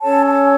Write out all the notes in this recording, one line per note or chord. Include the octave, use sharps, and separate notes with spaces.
C#4 A4 C#5 A5
A5